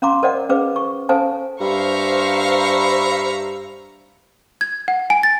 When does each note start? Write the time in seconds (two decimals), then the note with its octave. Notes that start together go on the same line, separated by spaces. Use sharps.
0.02 C#4 F5 A#5 C6 D6
0.23 A#4 C5 D5 D#5 F#5
0.49 C#4 G#4 B4 C5 F5 D6
0.76 C#6
1.09 C#4 A4 C5 F5 G#5 A5
1.61 G2 C5 E5 F5 A#5 B5 C#6
4.61 G#6
4.88 F#5
5.10 G#5
5.23 A6